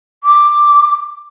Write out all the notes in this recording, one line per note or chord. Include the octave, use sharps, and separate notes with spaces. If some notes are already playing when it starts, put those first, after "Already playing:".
D6